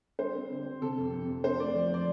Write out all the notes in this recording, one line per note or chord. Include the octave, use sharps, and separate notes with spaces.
G3 C5
C4
D3
C4
C3 A4
F2
F2
F2
C4 C5
A3 D5
F3
F3 D5